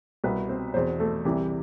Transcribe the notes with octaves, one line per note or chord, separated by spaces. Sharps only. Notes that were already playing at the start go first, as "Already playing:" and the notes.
C2 B2 B3 B4
C4 C5
E2 B2 C4 C5
A3 A4
C2 C3 E3 G3 G4